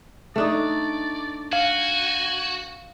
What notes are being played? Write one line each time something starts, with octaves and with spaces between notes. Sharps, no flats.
A3 D4 D#4 D5
F#4 F5 G#5